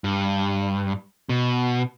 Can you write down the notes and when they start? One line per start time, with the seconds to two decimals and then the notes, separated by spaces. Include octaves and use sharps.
0.04 G2
1.29 B2